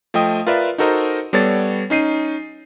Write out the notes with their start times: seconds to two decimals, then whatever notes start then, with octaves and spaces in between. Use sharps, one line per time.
0.14 F3 A3 D#5 G5 D#6
0.47 F4 A#4 B4 D5 E5
0.78 D#4 F#4 A4 A#4 C5 D#5
1.33 G3 B3 A4 C#5 D5 A6
1.90 C#4 D#4 C7 D#7